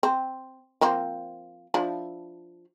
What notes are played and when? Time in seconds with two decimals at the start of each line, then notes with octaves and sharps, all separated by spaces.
0.03 C4
0.81 F3 A#3 C4
1.74 F3 D4 E4